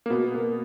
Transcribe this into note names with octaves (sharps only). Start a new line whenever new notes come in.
A#3
B2 B3
A#3